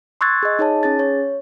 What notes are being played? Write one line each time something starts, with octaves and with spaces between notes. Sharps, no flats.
C6 C#6 E6 F#6 G#6 A6
G#4 D#5
D#4 G#4 C#5 A5
C#4 G#4 A6
C#5